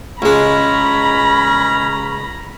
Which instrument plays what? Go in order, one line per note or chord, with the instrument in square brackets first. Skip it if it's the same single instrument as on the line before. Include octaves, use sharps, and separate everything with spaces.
[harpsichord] C#2 G#3 [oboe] C#4 [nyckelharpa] A#5 [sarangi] B5